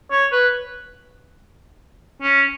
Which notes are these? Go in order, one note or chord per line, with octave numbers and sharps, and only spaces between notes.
C#5
B4
C#4